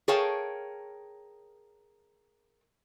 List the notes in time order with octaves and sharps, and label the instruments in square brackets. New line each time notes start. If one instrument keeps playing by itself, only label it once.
[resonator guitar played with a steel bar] G#4 A#4 C#5 F5 G5 A5